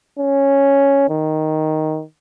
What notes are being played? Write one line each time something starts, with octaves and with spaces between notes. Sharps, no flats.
C#4
D#3